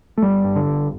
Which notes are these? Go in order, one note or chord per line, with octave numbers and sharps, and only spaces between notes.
A3
G1 G3
G2
D3
G1